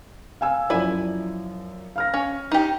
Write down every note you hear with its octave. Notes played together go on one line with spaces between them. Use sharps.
F5 G#5 E6
F#2 F3 E4 D5 G#5
F5 F6 A#6
C#4
D#4 G4